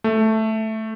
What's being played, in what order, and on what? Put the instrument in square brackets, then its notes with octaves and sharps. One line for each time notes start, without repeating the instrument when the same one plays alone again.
[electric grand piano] A3